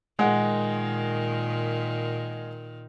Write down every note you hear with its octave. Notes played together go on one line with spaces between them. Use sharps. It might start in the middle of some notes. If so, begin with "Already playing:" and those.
A#2 D#3 G#3 F#5